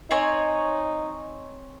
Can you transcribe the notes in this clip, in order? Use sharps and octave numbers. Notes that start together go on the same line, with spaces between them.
C4 D#4 C#5 G#5